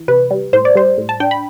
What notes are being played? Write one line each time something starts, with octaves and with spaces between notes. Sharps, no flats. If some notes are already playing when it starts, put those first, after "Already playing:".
Already playing: E3
C3 B4
G3
A2 C5
D5
G3 C5
A2
A5
D4 G5
B5